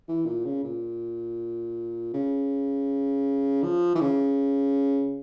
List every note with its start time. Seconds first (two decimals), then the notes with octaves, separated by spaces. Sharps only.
0.08 E3
0.26 A#2
0.45 C#3
0.64 A#2
2.13 C#3
3.63 F3
3.95 E3
4.01 C#3